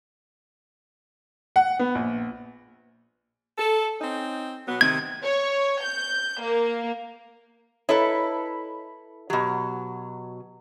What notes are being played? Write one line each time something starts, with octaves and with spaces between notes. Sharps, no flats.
F#5
B3
A#1
A4
C4 C#4 D#4
B2 F#3 B3
C3 D#3 G#6
C#5
G6
A#3
E4 A4 B4 C#5 D#5 A#5
B2 F#3 G4